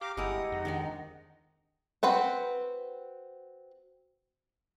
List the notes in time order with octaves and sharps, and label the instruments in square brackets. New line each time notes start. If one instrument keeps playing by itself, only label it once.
[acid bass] G4 [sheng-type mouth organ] F5 D6 [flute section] A#5
[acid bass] G1 [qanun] G#3 G4 A#4 [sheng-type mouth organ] E4 D#6 [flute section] F#5 A#5
[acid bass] F2 [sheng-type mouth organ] D#4
[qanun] D#3 G#3 D4
[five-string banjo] C4 F#4 B4 F#5